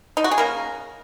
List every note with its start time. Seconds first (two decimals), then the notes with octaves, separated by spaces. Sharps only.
0.17 D#4
0.24 F#4
0.31 G#4
0.38 C#3 A#3 C#4 A#4